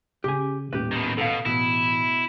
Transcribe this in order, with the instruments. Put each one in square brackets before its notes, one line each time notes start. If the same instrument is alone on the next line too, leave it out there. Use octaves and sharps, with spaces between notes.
[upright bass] C#3 C#4 [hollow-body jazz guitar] G4 G#5
[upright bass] D#1 A2 [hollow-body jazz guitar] G4 B4
[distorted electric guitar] B2 D#3
[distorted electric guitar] B2 [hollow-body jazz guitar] A4 B4 F5
[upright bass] A1 [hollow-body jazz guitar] B2 [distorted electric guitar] E4